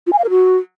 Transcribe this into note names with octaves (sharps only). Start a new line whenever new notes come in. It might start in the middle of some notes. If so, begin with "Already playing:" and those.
F4
G#5
F5
A#4
F#4